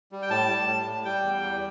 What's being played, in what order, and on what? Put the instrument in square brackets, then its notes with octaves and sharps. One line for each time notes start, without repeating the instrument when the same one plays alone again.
[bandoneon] G3
G5
A2 A5
G3
A2
A2
G3 G5
E2
G3